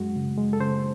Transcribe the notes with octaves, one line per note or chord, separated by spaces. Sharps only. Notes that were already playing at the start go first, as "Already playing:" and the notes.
Already playing: F#2 G#3 F#4
C#3
G#3
A4
C#3 C5